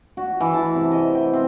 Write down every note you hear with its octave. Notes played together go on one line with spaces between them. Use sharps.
F#4
E3
A5
C3
D#5
G5
C4